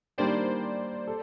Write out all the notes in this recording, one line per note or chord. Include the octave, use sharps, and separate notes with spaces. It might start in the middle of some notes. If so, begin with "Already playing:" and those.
D#3 G3 A#3 D4 G4 C5 D5
A4